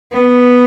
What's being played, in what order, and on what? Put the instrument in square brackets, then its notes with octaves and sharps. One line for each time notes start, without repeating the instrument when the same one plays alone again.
[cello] B3